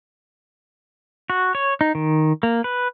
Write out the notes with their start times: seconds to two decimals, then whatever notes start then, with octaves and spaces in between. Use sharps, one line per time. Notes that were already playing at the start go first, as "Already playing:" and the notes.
1.30 F#4
1.55 C#5
1.81 D#4
1.95 D#3
2.43 A#3
2.64 B4